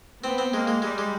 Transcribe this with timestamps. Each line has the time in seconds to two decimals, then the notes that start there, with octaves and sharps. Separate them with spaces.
0.23 B3 C4
0.38 C4
0.53 G#3 A#3
0.67 G#3
0.82 G3 G#3
0.98 G#3